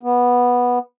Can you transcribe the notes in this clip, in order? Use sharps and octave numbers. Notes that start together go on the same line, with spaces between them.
B3